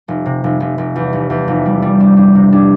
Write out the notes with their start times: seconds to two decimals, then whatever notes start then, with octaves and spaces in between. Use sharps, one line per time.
0.08 F1
0.26 C3
0.44 F1
0.60 F1
0.78 F1
0.96 E2
1.13 F1
1.30 E2
1.48 F1
1.65 G3
1.82 G3
2.00 D4
2.17 D4
2.35 C3
2.52 D4